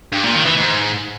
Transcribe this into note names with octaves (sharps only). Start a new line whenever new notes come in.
G2
A#2
D#3
E3
G#2